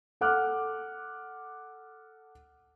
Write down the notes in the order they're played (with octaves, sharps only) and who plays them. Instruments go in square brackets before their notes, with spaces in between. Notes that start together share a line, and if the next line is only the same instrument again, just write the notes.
[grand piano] A4 F#5 D6 F6 F#6